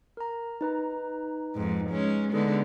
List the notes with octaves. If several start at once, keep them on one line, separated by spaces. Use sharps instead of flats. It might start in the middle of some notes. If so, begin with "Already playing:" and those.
A#4 A#5
D#4 B4 A#5
F2 G#2
G#3 C#4
D3 G#3 B3 D#4 G#4 A4